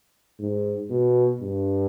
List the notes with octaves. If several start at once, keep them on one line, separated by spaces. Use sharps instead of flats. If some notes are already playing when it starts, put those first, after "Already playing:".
G#2
B2
G2